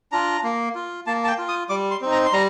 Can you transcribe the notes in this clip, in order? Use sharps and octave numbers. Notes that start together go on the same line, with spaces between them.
D4 F4 A#5
A#3
F4
A#3 A5
A5
G5
F4
D#6
G3 D6
C6
C4 D#4
A#5
C6
G3 A#5